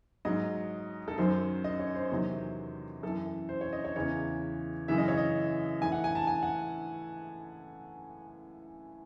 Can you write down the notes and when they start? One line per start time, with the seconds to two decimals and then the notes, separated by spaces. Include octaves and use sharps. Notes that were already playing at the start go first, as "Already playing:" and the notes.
0.25 G#2 F#3 D#5
1.08 A4
1.18 F#2 D#3 F#3 C5
1.64 D#5
1.79 C#5
1.95 C5
2.11 E2 C3 D#3 F#3
3.02 F#2 E3 A4
3.49 C5
3.61 C#5
3.73 D#5
3.85 C#5
3.96 E2 C#3 E3 C#5
4.88 F#2 C#3 E3 E5
4.98 D#5
5.08 C#5
5.18 D#5
5.81 A2 E3 G#5
5.92 F#5
6.04 G#5
6.15 A5
6.27 G#5
6.43 F#5